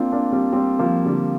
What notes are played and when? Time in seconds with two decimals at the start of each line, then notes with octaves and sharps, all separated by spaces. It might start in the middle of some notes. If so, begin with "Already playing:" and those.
Already playing: A#3 C4 D4 F4
0.12 A#3 D4
0.32 G3 C4
0.52 G3 C4
0.79 F3 A#3
1.06 D3 G3